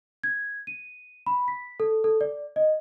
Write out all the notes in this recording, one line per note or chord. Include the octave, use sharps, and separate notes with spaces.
G#6
D#7
B5
B6
A4
A4
D5
D#5